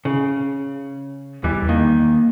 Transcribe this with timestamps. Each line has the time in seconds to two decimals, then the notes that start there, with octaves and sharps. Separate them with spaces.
0.05 C#3
1.44 E2 E3 G3
1.69 D#3 A#3